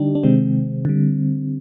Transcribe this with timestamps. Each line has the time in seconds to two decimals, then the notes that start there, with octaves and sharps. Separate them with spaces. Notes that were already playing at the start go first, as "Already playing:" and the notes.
Already playing: D3 G3 D4 D#4 G4
0.15 D4
0.23 C3 D#3 G#3 C4
0.85 D3 G3